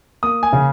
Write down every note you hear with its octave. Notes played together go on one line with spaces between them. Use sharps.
A#3 D#6
G#5
C#3